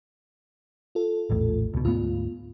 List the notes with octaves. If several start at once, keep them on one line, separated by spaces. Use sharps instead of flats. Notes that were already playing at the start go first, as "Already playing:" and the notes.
F4 A4
A#1 E2 A2
C#2 B2
D2 G#2 B3 F4